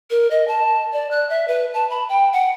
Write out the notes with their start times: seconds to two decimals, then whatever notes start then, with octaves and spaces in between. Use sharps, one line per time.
0.11 A#4
0.31 D#5
0.48 A5
0.93 D5
1.11 F#6
1.30 E5
1.48 B4
1.74 A5
1.90 B5
2.09 G5
2.33 F#5